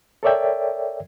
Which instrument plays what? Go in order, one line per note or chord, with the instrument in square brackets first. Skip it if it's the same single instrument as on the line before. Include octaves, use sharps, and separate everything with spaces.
[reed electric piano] A4 A#4 C#5 D5 E5 G5